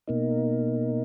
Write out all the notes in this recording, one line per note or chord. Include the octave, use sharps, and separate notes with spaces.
B2 A#3 D#4